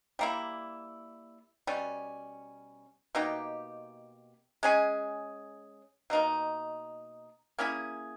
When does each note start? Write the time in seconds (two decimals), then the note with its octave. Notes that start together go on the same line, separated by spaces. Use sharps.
0.19 G3 A#3 E4
1.67 B2 G3 C#4
3.15 B2 A#3 D#4 G4
4.63 G#3 C#4 G#4
6.10 B2 A#3 D#4 A#4
7.59 A#3 C#4 E4 G#4